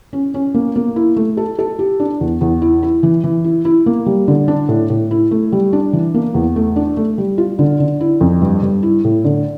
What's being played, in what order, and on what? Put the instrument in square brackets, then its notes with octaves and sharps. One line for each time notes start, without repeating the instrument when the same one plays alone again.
[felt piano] C#4
C#4
A#3
A#3
E4
A3
A4
A4
G4
D4
E2
E2
E4
E4
E3
E3
E4
E4
A#3
G3
D3
D4
A2
A2
E4
A3
G3
D4
E3
A#3
E2
A3
D4
A3
G3
F4
D3
D3
E4
F2
G2
G2
E4
A2
D3